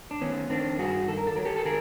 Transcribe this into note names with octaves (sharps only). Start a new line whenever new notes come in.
D4
D#3 B3 C#4
D#3 C4 D4
G2 F#4 G#4
D#3 A4
A#4
A4
F#3 A#4
G4 A4
A4
D#3 G#4 A#4